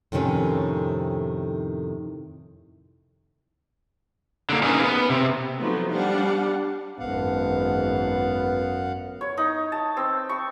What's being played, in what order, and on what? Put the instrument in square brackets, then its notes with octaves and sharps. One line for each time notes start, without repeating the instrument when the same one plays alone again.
[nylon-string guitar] F2 A2 C3 D#3 C#4
[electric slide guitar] D3 A#3
C#4 D#4 G#4 A#4 B4
B3
C3
[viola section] F3 F#3 A3 B3 D#4
G3 D4 F5 F#5
[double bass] G#1 [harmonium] F#2 F5 F#5 [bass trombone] B3
[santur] C#5
D#4
A5
C4
C#6